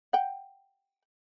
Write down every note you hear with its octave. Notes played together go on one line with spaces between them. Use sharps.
F#5 G5